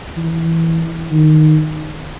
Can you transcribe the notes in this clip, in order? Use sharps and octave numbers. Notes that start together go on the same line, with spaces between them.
E3
D#3